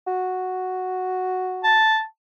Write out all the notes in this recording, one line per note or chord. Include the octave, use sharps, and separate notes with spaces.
F#4
A5